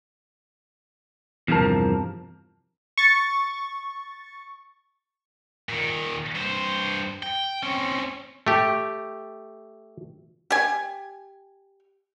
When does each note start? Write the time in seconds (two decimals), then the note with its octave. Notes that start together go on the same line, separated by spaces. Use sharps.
1.48 E2 G2 C3 F3 A#4 A5
2.98 C#6 A6
5.69 A#2 D#3
6.35 G2 C5
7.23 G5
7.63 C4 C#4
8.47 A3 G4
10.50 G4 G#5